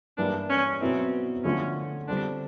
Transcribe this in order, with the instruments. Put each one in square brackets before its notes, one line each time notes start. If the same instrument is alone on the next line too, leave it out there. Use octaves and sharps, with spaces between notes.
[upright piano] G2 E3 G3 A#3 [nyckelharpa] D4
[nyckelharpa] C#4
[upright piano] B2 F#3 B3 E4 [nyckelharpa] C4
[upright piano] D3 F3 A3 [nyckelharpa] C#4
[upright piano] D3 G3 C4 [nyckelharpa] D4